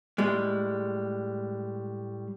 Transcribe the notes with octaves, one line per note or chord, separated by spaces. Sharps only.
A2 G3 G#3